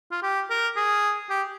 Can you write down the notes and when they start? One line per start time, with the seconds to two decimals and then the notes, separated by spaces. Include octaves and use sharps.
0.11 F4
0.22 G4
0.50 A#4
0.76 G#4
1.30 G4